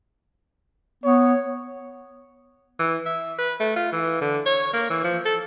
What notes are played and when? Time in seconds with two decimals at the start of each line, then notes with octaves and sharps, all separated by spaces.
1.04 B3 C#5
2.79 E3
3.06 E5
3.38 B4
3.60 A3
3.76 F4
3.92 E3
4.21 D3
4.46 C#5
4.73 A#3
4.90 E3
5.04 F3
5.25 A4